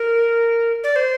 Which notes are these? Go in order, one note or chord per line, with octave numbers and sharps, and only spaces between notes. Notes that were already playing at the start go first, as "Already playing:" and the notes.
Already playing: A#4
D5
C5